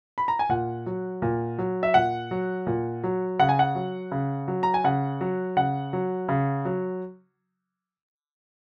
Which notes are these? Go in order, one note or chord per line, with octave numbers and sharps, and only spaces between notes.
B5
A#5
G#5
A#2 F#5
F#3
A#2
F#3
E5
A#2 F#5
F#3
A#2
F#3
C#3 F#5
G#5
F#5
F#3
C#3
F#3
A#5
G#5
C#3 F#5
F#3
C#3 F#5
F#3
C#3
F#3